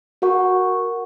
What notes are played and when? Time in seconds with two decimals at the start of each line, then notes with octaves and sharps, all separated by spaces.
0.22 F#4 A#4 F#5 C#6